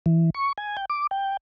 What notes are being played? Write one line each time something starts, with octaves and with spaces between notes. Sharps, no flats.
E3
C#6
G#5
G5
D6
G5